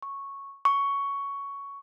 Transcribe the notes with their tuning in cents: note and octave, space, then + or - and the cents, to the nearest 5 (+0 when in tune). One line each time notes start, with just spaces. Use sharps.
C#6 -5
C#6 +10